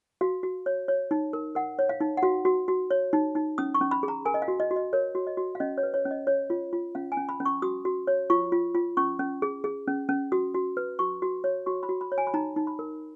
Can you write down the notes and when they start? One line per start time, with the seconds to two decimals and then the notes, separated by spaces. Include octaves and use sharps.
0.21 F#4 F5
0.43 F#4
0.66 C#5
0.88 C#5
1.11 D#4
1.33 A#4
1.55 A#4 F#5
1.79 C#5
1.89 F5
2.01 D#4
2.17 F#5
2.23 F#4 F5
2.45 F#4
2.68 F#4
2.90 C#5
3.13 D#4
3.35 D#4
3.58 C#4 D#6
3.74 C#6
3.81 C#4
3.91 B5
4.03 G#4
4.08 A#5
4.25 A#4 G#5
4.34 D#5
4.42 F5
4.48 F#4
4.60 D#5
4.71 F#4
4.76 D#5
4.93 A#4 C#5
5.15 F#4
5.27 D#5
5.37 F#4
5.55 F5
5.60 C#4 D#5
5.78 C#5
5.83 B4
5.94 C#5
6.05 C#4
6.11 D#5
6.27 C#5
6.50 F4
6.73 F4
6.95 C#4 F5
7.12 G#5
7.17 C#4
7.29 B5
7.40 C#4
7.45 C#6
7.62 F#4 D#6
7.85 F#4
8.07 C#5
8.30 F4 C#6
8.52 F4
8.75 F4
8.97 C#4 C#6
9.19 C#4
9.42 G#4
9.64 G#4
9.88 C#4
10.09 C#4
10.32 F#4 D#6
10.54 F#4
10.77 B4
10.99 F#4 C#6
11.22 F#4
11.44 C#5
11.66 F#4 C#6
11.83 B5
11.89 F#4
12.01 B5
12.12 C#5
12.18 G#5
12.27 B5
12.34 D#4 A#5
12.56 D#4
12.67 B5
12.79 A#4